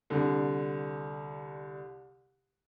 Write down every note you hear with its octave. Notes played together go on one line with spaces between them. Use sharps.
C2 D3